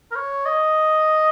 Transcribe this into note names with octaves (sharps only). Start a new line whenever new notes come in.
A#4
C#5
D#5